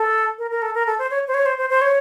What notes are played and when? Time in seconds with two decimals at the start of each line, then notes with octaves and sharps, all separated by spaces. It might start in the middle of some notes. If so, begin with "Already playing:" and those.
Already playing: A4
0.38 A#4
0.51 A#4
0.62 A4
0.75 A#4
0.87 A4
0.99 C5
1.11 C#5
1.28 C5
1.34 C#5
1.46 C5
1.58 C5
1.70 C5
1.81 C#5